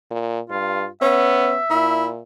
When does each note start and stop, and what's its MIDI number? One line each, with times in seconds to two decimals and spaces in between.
0.11 0.40 46
0.50 0.85 43
0.50 0.88 65
1.02 1.60 59
1.02 1.54 61
1.02 2.22 76
1.70 2.21 46
1.70 2.07 64